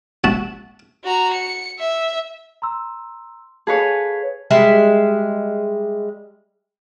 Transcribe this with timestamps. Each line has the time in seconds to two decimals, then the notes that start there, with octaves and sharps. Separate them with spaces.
0.24 F#4 E5 F#5 A5
1.04 F#4 A#5
1.33 C#7
1.79 E5
2.62 A#5 C6 E6
3.67 G#4 A4 B4 C#5 F5 A5
4.51 G3 G#3 E5